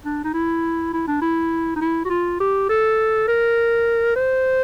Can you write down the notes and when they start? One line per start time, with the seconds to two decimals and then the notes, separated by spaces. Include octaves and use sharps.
0.05 D4
0.24 D#4
0.34 E4
0.93 E4
1.07 D4
1.22 E4
1.76 D#4
1.81 E4
2.05 F#4
2.10 F4
2.40 G4
2.69 A4
3.28 A#4
4.16 C5